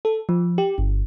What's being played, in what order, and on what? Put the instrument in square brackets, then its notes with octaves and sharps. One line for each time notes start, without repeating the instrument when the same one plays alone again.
[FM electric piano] A4
F3
G4
G1